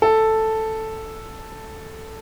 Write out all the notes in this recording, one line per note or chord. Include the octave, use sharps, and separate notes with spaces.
A4